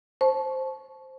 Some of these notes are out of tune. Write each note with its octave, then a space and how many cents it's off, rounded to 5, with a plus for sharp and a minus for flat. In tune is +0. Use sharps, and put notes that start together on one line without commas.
C5 +10 A5 -25 C#6 +0